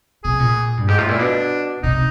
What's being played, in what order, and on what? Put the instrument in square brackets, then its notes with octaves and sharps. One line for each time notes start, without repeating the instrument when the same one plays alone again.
[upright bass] C3 [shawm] G#4
[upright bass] A#2
G2
[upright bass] G#2 [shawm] G4
[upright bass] A2 [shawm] F4
[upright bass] A#2 [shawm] E4
[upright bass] B2 [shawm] D4
[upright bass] C3 [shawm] D#4